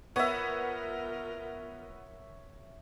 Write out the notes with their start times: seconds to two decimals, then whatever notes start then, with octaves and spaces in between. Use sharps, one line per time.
0.16 B3 F4 A#4 C#5 E5